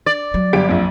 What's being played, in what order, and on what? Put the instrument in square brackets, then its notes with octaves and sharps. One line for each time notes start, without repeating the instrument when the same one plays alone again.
[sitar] D5
[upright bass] F#3
[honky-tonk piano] G1 G4 D7
A#1 F2